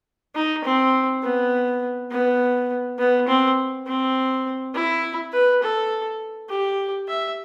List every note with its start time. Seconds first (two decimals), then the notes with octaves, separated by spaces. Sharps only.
0.35 D#4
0.64 C4
1.23 B3
2.11 B3
2.99 B3
3.28 C4
3.87 C4
4.74 E4
5.33 B4
5.63 A4
6.50 G4
7.09 E5